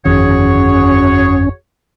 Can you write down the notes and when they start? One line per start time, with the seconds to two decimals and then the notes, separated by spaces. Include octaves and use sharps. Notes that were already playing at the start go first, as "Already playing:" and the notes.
0.05 G1 F2 D#3 C#4 F#4 G#4 C#5